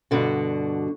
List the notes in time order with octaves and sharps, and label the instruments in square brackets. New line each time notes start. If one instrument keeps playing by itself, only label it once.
[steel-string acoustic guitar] G2 B2 D3 F#4